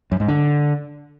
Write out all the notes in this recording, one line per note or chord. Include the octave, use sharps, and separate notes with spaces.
F#2
G#2
D3